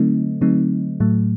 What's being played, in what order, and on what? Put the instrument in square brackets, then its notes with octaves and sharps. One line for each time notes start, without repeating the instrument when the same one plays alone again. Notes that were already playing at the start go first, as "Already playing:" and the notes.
Already playing: [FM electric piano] D3 F#3 A3 C4 D#4
D3 F#3 A3 C4 D#4
A2 F#3 A3